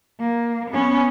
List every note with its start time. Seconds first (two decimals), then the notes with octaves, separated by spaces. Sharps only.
0.20 A#3
0.70 B3 C#4